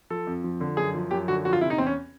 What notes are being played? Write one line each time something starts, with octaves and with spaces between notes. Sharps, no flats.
F3 A4
F2
F3
D3
F#2 G#4
F3
F#2 G4
D3 F#4
F3 F#4
F4
C3 E4
D#4
E2 C4
C#4